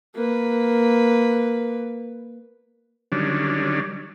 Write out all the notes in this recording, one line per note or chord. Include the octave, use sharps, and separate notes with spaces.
A#3 B4
D3 D#3 F#3 G3 C#4 D4